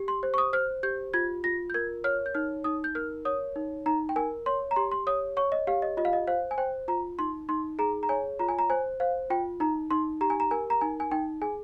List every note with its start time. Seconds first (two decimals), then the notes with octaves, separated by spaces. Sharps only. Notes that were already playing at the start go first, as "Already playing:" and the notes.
Already playing: G4
0.08 C6
0.23 C5
0.34 C#6
0.38 D#6
0.53 C5 F6
0.83 G4 G6
1.14 F4 G#6
1.44 F4 A#6
1.70 G6
1.74 A#4 G#6
2.04 C#5 F6
2.26 G6
2.35 D#4 F6
2.64 D#4 D#6
2.84 G6
2.95 A#4 F6
3.25 C#5 D#6
3.56 D#4
3.86 D#4 A#5
4.09 G5
4.16 A#4 G#5
4.46 C#5 C6
4.71 A#5
4.76 G4 C6
4.91 C6
5.07 C#5 D#6
5.37 C#5 C#6
5.52 D#5
5.67 G4 F5
5.82 D#5
5.97 F4 D#5
6.05 F5
6.13 D#5
6.27 C5 F5
6.51 G#5
6.58 C5 G5
6.88 F4 A#5
7.19 D#4 C6
7.49 D#4 C6
7.79 G#4 A#5
8.03 A#5
8.09 C#5 G#5
8.39 F4 A#5
8.49 G#5
8.59 A#5
8.70 C5 G#5
9.00 C5 F5
9.30 F4 G5
9.60 D#4 A#5
9.91 D#4 C6
10.21 G4 A#5
10.30 G#5
10.40 A#5
10.51 A#4 G#5
10.70 A#5
10.81 D#4 G#5
11.00 G#5
11.12 D#4 G5
11.42 G#4 G#5